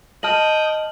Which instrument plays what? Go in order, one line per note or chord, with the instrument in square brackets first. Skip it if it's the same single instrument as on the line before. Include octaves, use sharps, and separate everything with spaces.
[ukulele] D#5 A5 [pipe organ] G5 D#6 [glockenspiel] F6 F#7